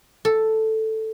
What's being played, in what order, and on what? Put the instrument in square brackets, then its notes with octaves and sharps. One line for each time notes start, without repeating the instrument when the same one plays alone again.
[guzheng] A4